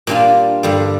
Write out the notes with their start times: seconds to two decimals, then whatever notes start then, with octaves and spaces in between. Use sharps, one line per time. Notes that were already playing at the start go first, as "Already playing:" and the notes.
0.07 A#2 G3 D4 F4
0.63 G2 D3 G3